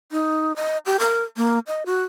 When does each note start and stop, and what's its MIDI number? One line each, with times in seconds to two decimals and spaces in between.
0.12 0.55 63
0.56 0.78 75
0.86 0.99 67
1.00 1.23 70
1.37 1.59 58
1.67 1.83 75
1.86 2.04 66